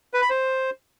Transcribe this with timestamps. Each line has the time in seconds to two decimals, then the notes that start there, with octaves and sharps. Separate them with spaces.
0.14 B4
0.22 B5
0.30 C5